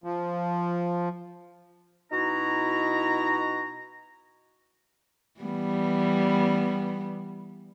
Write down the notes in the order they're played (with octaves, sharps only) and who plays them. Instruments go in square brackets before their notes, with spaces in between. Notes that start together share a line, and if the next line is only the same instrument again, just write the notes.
[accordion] F3
[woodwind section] B2 D#4 E4 F#4 A#5
[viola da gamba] E3 G3 B3